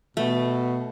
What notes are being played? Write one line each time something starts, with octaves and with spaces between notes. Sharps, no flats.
B2 A3